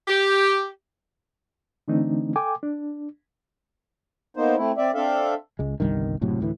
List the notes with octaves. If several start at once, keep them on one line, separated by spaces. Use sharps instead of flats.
G4
D3 E3 A3 C4 D4 D#4
A4 G5 G#5 D6
D4
A#3 B3 D#4 C5
A3 C4 E4
C4 D5 E5
C4 D4 A4 E5 F5
C#2 G#3
G1 C2 G2 D#3
F#1 A2 C3 F#3
D2 A2 E3